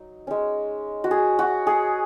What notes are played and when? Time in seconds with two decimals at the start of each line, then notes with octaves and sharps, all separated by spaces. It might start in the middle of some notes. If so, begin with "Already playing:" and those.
Already playing: F#3 D#4
0.27 G#3 C#4
1.04 F#4
1.11 G#4
1.39 F#4
1.67 G#4